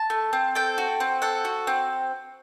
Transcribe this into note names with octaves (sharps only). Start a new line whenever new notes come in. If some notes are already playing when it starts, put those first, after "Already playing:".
Already playing: A5
A3
C4
A4 G5
F#4
C4
A4 F#5
F#4
C4